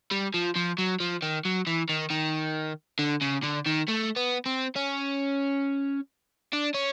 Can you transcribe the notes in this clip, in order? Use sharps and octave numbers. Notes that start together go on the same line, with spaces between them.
G3
F3
F3
F#3
F3
D#3
F#3
E3
D#3
D#3
D3
C#3
D3
D#3
A3
B3
C4
C#4
D4
C#4